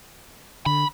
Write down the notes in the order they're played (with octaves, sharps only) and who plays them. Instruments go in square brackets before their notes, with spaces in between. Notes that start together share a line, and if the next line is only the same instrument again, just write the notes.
[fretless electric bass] D3 [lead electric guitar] B5